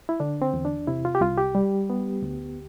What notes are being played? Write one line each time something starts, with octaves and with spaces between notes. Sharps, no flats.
E4
D3 D4
C4
E2
D4
C3 E4
F4
G4
C2 F4
G4
G3
B3
D2